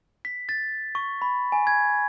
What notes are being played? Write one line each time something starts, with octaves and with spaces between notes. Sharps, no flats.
B6
A6
C#6
B5
G#5
G#6